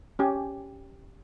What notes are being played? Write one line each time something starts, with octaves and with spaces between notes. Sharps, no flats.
C#4 G4 G#5